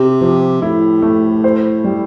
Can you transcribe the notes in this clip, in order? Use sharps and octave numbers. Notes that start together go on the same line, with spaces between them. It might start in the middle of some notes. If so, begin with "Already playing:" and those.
Already playing: C3 G4
F3
A2 E4
A3
C5
G3